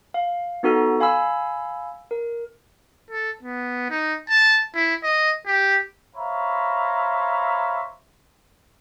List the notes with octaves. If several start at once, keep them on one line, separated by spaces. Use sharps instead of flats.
F5
B3 D#4 F#4 A4 F6
F5 G#5 B5 E6
A#4
A4
B3
D#4
A5
E4
D#5
G4
C5 C#5 E5 F5 A#5 B5